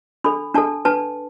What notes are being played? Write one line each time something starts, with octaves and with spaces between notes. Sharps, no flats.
D4 A4 B5
D4 A4 A5
D4 B4 A5